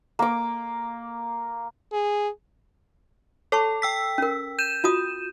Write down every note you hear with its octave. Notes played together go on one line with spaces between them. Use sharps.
A#3 D6
G#4
A4 C#5 A5 C#6
G5 E6 B6
C#4 A#4
G6 D#7 E7
F4 F#4 D#6